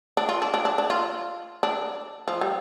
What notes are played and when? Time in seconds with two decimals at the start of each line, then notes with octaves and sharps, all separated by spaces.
0.17 D4
0.29 F4
0.42 D4
0.54 D4
0.65 D4
0.78 D4
0.90 F4
1.63 D4
2.28 F3
2.41 G3